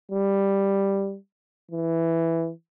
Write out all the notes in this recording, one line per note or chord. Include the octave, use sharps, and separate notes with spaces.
G3
E3